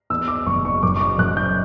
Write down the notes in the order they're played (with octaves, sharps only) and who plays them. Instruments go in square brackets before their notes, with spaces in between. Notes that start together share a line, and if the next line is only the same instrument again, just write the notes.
[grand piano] E2 E6
D6
F#1 C#6
C#6
F#2 D6
C#6
D6
F#2 F#6
G6